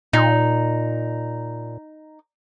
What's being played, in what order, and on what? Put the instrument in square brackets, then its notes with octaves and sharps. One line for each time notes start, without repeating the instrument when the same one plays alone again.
[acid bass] A#2 [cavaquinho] D#4